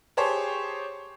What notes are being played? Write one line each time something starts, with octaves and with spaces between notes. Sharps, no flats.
G4 G#4 C5 C#5 A5